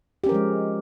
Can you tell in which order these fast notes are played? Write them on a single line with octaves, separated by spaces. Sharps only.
G4 C#4 A#4 F3 G#3